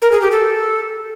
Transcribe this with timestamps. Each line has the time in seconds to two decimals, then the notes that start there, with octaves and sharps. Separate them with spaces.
0.02 A#4
0.12 G#4
0.22 G4
0.32 A4